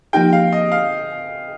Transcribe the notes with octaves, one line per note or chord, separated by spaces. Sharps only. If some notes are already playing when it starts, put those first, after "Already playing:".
F3 A#3 D#4 G4 G5
F5
D#5
F5